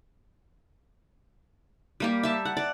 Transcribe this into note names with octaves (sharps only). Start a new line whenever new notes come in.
G3 A#3 G4
E5 A5
F#5
D5